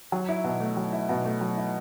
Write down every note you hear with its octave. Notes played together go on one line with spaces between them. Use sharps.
F#3
E4
B2
A3
F#3
E4
B2
A3
F#3
E4